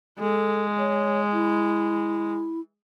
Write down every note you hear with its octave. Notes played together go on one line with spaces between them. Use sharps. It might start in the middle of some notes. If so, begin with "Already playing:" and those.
G#3 A4
C#5
E4